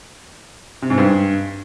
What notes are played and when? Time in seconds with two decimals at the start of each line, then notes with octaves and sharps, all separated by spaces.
0.82 C3
0.90 G#2
0.98 G2